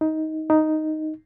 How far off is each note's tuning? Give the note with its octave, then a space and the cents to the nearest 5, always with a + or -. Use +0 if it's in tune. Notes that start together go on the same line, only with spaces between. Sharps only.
D#4 +15
D#4 +0